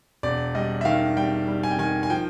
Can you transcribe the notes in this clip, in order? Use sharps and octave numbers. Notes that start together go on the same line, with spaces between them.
E1 D5
G3 D#5
E5
D#3 F5
G3 G5
G3
G#5
G5
D#3 G#5
G#5
F3 G5